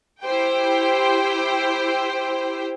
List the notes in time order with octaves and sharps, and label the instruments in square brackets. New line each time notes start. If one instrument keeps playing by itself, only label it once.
[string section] E4 G4 C5 G5